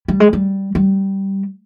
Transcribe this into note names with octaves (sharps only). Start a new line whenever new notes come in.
G3
G#3
G3
G3